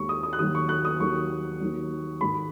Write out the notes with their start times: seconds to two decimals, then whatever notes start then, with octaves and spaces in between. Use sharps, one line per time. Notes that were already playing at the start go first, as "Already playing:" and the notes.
Already playing: D#2 D#3 G#3 C#6
0.09 D#6
0.23 D#6
0.33 F#6
0.39 D#2 D#3 F#3 D#6
0.55 C#6
0.69 F#6
0.85 D#6
1.00 D#2 D#3 F#3 C#6
1.60 D#2 D#3 F#3
2.21 G#2 D#3 G#3 B5